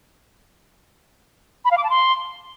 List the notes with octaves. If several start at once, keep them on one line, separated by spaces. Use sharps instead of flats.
B5
F5
D6
A5
C6